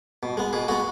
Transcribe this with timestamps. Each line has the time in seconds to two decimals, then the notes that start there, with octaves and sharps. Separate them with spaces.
0.23 B2
0.37 G#3 B3
0.53 B2 G#4
0.68 G#3 B3 F#4